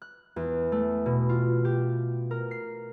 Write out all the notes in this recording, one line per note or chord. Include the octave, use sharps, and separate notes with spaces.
F#6
E2
A3
B2
F4
G4
A#4
C7